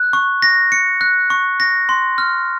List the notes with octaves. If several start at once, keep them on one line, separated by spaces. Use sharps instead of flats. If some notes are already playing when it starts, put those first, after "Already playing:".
Already playing: F#6
C#6
A#6
C#7
F#6
C#6
A#6
C6
F6